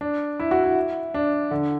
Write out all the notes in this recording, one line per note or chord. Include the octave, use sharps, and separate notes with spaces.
D4
E4
F#4
E4
D4
D3